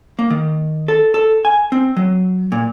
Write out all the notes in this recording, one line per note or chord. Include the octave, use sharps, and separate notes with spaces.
A#3
D#3
A4
A4
G#5
C4
F#3
A#2